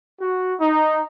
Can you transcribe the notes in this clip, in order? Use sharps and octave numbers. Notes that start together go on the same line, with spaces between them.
F#4
D#4